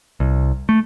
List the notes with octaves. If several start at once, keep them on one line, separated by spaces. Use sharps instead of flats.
C2
A3